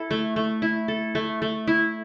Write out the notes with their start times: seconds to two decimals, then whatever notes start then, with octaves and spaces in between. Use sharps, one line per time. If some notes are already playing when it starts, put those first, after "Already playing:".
Already playing: E4 A4
0.11 A3
0.36 A3
0.62 E4
0.88 A4
1.15 A3
1.42 A3
1.67 E4